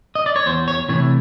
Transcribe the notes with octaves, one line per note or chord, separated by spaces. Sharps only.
D#5
D5
C#5
E2 C5
C#5
C3 E3 A3 C#5